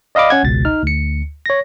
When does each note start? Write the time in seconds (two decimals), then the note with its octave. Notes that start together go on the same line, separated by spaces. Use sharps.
0.15 D5 D#5 F5 B5 D6
0.30 C#4 F#5 G#6
0.43 G#1 C#2 B2 A6
0.65 D#4 F6
0.83 D2 C#7
1.46 C#5 A#6